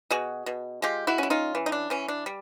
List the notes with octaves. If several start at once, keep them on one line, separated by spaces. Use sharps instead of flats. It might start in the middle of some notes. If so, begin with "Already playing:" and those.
B2 F#4 G#4
B2
G#3 F4 G4
E4 F#4
C#4 E4
D#4 F4
E3
D#4
D4
E3 C#4
D4
G3